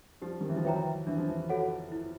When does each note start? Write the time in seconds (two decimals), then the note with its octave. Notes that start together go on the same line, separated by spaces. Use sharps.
0.21 F3 G3 G4
0.41 D#3
0.49 E3
0.56 F3
0.64 E3 F#3 B4 E5 G5 A#5
1.07 E3 D4
1.17 F3
1.29 E3
1.49 F#4 A4 C#5 F#5
1.92 E4